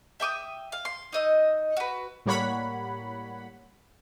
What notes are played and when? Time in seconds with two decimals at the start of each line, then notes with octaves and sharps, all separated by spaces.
0.20 E5 G5 D6 D#6
0.72 F5
0.85 C6
1.13 D#4 D#5 E6
1.77 F#4 B4
2.26 A2 G3 A#3 C#5 F#5 B5